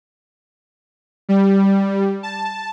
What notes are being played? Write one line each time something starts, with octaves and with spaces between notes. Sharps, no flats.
G3
A5